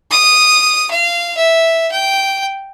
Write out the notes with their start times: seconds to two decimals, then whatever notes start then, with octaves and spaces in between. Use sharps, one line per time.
0.11 D#6
0.91 F5
1.37 E5
1.92 G5